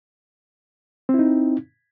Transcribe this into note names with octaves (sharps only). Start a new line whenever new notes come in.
C4 D#4 E4